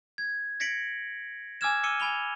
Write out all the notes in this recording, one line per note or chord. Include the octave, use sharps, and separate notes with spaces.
G#6
G#6 A#6 B6 C#7 D7 F#7
G#5 D6 E6 F6 G#6 E7
D6 E6 F6 C#7 D#7 G7
G#5 B5 F7 G7